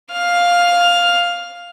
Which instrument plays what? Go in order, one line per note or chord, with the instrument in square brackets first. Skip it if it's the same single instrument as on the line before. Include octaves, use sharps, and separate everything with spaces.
[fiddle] F5 F6